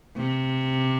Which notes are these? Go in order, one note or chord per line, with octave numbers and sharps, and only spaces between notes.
C3